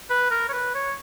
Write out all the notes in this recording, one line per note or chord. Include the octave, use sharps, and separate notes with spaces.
B4
A#4
C#5
B4
C#5